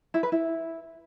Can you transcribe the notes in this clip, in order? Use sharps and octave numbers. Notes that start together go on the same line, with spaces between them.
E4
B4
E4